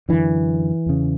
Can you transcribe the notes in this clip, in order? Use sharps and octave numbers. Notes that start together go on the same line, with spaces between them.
F#2 D3 E3
E2 C#3